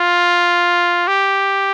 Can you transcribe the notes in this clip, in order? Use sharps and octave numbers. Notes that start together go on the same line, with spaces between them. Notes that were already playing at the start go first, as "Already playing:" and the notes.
Already playing: F4
G4